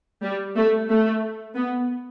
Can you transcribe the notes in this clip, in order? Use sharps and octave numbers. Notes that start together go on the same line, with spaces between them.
G3
A3
A3
B3